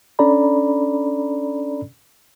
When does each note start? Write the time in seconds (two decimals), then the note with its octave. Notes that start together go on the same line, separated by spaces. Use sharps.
0.19 C#4 D4 A4 D5 A#5 B5